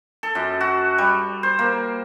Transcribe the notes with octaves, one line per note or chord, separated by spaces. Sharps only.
A4
F#2
F#4
G3
C5
A#3